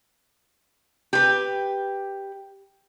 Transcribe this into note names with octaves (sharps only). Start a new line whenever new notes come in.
G4 B4